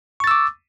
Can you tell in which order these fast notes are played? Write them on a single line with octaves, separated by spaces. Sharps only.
C#6 A6 E6 D6